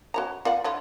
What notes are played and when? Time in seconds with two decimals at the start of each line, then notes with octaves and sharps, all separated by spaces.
0.14 F#4 C#5 A#5
0.45 F4 D5 F#5
0.64 D3 E4 F4